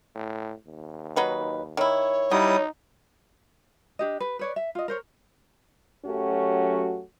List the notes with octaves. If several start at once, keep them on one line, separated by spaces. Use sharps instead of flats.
A2
D#2
F#3 D#4 B4
D#3 E4 C#5
F#3 G3 D#4 E4 D#6
D4 G4 D#5
B4
B4 C#5 D5
E5
F4 D#5
A#4 C5 C#5
F#2 F#3 A3 C#4 F#4 G4